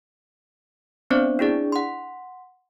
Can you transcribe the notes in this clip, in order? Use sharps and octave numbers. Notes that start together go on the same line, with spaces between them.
B3 C4 D4 C5 D5
D4 E4 G#4 D5
F#5 C6